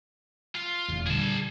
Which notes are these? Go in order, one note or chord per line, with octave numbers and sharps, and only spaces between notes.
F4
F1 B1 E2
A#2 D3 G3 G#4 A5